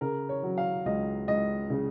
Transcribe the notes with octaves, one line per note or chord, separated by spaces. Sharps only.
C#3 A#4
C#5
F#3
F5
C#2 D#5
C#2 D#5
C#3